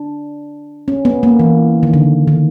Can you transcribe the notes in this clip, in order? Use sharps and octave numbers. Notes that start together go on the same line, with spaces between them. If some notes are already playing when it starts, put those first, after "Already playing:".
Already playing: D4
C#4
B3
A#3
E3
D#3
D3
D#3